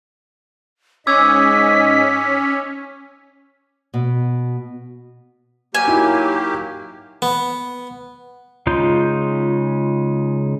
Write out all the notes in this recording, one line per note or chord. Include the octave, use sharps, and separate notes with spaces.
G#2 C#4 D#5 D6 E6 G#6 B6
B2
F#3 A#3 G4 G#5
D#4 E4 F#4
B3
C#3 G#3 D#4 F4 G6